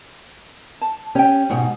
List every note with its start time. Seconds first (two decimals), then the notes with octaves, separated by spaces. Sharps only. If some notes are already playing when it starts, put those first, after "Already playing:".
0.81 A5
1.15 C#4 G4 G5
1.50 G#2 B2